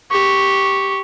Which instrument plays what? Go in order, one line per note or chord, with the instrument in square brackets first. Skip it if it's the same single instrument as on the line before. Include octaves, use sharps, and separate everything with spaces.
[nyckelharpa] G4 C#6